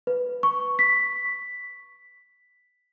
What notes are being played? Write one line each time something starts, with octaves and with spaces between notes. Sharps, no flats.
B4
C#6
B6